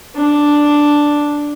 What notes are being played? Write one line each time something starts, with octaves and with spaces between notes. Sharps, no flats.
D4